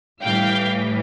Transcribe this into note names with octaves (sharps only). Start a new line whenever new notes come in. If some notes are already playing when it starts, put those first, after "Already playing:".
A2 E3 G3 F5 G5